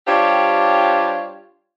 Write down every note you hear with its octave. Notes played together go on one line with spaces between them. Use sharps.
G3 D4 F4 G4 C5 C#5